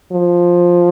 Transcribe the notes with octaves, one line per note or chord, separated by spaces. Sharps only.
F3